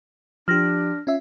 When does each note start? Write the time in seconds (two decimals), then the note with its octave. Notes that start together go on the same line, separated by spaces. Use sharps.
0.48 F3 D4 G4 F6 A#6
1.07 C#4 F4 E5